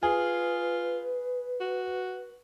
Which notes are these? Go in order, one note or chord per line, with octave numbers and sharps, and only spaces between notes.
F4 G#4 B4
F#4